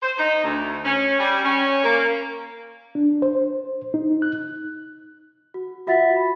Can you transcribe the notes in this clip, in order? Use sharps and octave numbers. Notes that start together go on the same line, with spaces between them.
C5
D#4
D2
C#4
G3
C#4
A#3
D4
C5
D#4
F#6
F#4
F4 F#4 E5 F#5 A6 B6
B5